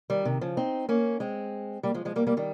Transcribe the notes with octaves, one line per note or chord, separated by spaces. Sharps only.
D#3 G3
C3 D#3
C#3 F3
C4 D#4
A#3 C#4
G#3 C4
G3 A#3
F3 G#3
F3 G#3
G3 A#3
G3 A#3
D#3 G3